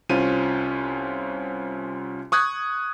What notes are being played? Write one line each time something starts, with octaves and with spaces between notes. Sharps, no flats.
C2 C#4 F4 C5 D#7
C#6 D#6 F#6 G#6